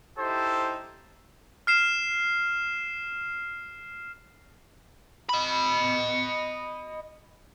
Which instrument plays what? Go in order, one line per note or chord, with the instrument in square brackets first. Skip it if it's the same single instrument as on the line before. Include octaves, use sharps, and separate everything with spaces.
[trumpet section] D#4 E4 G4 A4 C5
[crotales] F6 C7 E7
[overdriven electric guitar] D#5 B5